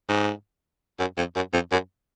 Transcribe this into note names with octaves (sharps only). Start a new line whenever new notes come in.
G#2
F#2
F2
F#2
F2
F#2